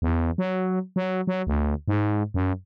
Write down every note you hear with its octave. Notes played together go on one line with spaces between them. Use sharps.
E2
F#3
F#3
F#3
D2
G#2
F#2